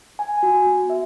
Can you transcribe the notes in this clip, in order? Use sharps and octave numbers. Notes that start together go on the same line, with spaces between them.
G#5
F#4
B3
E5